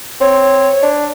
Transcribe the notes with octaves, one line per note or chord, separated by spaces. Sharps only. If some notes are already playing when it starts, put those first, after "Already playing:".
C4 C#5
D4